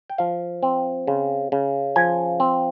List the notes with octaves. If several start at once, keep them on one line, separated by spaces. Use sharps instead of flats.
G5
F3 F5
C4
C#3
C#3
F3 G#5
C4